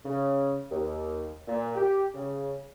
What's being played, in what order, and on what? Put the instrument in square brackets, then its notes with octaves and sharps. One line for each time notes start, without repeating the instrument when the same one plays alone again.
[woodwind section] C#3
D#2
A#2
G4
C#3